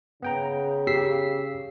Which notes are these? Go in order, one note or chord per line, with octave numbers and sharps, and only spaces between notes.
C#3 B3 G5 A#5
G4 E6 B6 C7